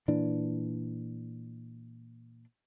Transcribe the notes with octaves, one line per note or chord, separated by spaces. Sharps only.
A#2 E3 D4